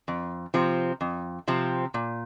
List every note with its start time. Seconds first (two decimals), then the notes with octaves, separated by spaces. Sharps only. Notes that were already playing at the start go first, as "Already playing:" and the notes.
0.08 F2
0.54 C3 F3 C4
1.01 F2
1.48 C3 F3 C4
1.94 A#2